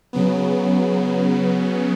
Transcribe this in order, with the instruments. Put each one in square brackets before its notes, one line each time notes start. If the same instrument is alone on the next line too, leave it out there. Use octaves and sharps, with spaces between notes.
[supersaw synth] C#3 F#3 B3